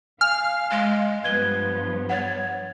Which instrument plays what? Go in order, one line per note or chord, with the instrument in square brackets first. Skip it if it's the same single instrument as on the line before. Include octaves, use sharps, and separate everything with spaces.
[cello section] F5 [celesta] G#5 [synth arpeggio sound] F6
[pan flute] G#3
[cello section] G2 F3 B3 [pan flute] B4 [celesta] G#6 G7
[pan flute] C#5 [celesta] F#5 A6